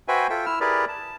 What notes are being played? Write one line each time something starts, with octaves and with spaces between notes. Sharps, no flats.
F#4 B4 C5 E5 G5 G#5
F4 A4 E5 G5
E4 E6 F6
E4 G4 G#4 A#4 B4 D5
A5